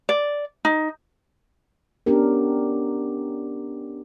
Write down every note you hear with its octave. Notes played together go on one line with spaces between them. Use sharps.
D5
D#4
B3 C#4 D4 G4 A#4